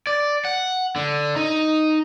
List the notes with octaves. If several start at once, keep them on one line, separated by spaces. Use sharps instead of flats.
D5
F#5
D3
D#4